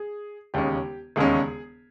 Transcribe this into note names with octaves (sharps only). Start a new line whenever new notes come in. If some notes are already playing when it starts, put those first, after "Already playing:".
Already playing: G#4
E1 D#2 C#3 G#3 C#4 G4
E1 D#2 C#3 G#3 C#4 G#4